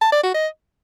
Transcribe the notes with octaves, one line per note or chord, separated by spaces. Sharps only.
A5
D5
F#4
D#5